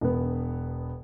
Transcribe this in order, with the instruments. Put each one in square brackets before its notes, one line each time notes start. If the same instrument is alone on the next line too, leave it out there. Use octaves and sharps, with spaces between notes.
[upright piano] E1 B3